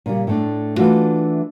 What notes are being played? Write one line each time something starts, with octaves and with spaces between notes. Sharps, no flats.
A#2 C#3 G3
A2 A3 D4
E3 A3 D4 F4 F#4